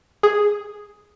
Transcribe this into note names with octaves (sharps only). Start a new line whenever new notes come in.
G#4